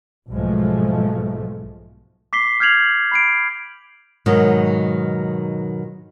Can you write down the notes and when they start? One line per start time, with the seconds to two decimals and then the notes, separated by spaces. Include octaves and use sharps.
0.30 B1 G#2 F3 G#3 A3
2.33 D6 B6 C7 G7
2.60 F6 G6 G#6 C7 F7 F#7
2.77 G#6
3.12 B5 C7 D7
4.26 G#2 B2 D#3 F#3